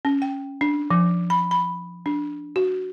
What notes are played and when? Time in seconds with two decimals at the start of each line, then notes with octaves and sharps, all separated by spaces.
0.05 C#4
0.22 G5
0.61 D4
0.91 F3
1.30 B5
1.51 B5
2.06 D4
2.56 F#4